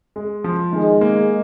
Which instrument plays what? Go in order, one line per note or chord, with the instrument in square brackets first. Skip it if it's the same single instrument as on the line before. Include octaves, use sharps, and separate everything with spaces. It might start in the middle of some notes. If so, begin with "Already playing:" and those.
[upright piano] G#3
F3
[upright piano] D#3 [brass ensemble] G#3
[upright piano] A#3